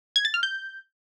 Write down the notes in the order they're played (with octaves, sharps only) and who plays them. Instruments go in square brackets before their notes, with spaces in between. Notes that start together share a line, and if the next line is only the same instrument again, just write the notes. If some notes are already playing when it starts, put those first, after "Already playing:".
[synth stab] G#6
A6
F6
G6